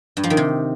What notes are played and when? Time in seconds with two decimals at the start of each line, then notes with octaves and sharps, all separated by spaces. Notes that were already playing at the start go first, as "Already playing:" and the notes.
0.17 G2
0.24 F3
0.30 D#3
0.37 C3